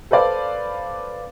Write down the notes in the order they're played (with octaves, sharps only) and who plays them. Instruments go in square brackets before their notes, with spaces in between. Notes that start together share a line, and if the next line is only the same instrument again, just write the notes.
[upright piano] A4 B4 C5 D5 F5